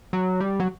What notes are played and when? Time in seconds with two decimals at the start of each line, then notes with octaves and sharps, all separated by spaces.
0.13 F#3
0.40 G3
0.60 F#3